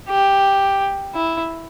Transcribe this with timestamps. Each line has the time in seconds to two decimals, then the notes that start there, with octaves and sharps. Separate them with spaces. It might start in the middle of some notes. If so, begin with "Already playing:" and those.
0.09 G4
1.15 E4